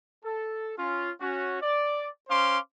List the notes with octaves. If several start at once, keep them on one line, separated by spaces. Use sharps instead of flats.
A4
C#4 F4
C#4 F#4
D5
C#4 C5 F5 C6 D6